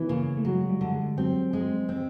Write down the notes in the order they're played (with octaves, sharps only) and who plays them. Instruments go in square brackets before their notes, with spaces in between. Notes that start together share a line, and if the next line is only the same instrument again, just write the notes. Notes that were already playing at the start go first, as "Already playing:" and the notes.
Already playing: [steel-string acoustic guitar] E3 [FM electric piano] B3
[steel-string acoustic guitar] C#3 [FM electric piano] A#3
[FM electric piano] A3
[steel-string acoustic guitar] F#3 [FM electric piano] G#3
[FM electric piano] G3
[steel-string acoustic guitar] D3
[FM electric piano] G#3
[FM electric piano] F#3 [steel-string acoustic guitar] C4
[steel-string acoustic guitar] G#3
[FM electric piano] E3 [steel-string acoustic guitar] C4